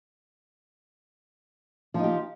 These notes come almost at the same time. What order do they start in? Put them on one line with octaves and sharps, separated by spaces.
F3 D#4 G4